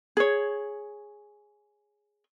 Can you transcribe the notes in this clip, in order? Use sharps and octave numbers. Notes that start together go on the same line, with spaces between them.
G#4 C#5